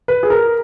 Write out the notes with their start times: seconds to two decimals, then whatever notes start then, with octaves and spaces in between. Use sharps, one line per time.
0.08 B4
0.23 G#4
0.30 A#4